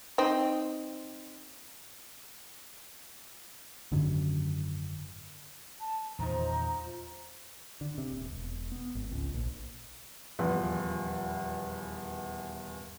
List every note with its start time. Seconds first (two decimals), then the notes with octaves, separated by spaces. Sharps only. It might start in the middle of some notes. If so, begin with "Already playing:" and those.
0.18 C4 D#4
3.92 G#1 F#2 D3 F#3
5.80 A5
6.19 E2 A#2 D#3 F3 D#4 A#5
7.81 D3
7.98 C3
8.11 D#1
8.33 E1
8.72 B3
8.95 G#1
9.11 C#2
9.34 A#1
10.39 D#1 E2 F3 B4